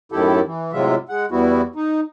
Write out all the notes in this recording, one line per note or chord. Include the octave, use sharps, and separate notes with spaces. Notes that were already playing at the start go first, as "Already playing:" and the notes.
F#2 A2 D#3 E4 G4 A4
E3
A2 C3 F#3 G#3 F4 E5
G#3 F#5
E2 G3 B3 E4 F#4
D#4